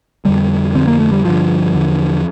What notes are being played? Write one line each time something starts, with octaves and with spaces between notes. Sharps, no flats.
F2 D3 G3
F2 D3 C4
A#3
A3
G3
G2 D3 F3
E2 D3